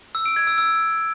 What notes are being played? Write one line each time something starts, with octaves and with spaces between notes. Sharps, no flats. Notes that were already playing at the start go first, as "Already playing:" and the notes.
E6
D7
G#6
E6
E6